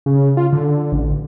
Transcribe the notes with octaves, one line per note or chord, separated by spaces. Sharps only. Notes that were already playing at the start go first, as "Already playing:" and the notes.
C#3
F4
D3
A1